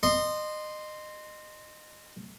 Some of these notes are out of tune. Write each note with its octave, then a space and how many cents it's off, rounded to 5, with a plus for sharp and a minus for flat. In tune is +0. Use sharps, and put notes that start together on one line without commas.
D#5 -25 C6 +0